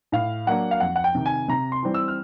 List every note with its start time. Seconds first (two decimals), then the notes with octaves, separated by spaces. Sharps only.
0.12 A2 F5
0.47 F#3 A#3 D4 F#5
0.71 F5
0.80 F2 F#5
0.96 F#5
1.04 G5
1.15 C3 D#3
1.26 G#5
1.48 C3 A#5
1.72 C6
1.82 E3 G3 C4
1.94 E6
2.08 F6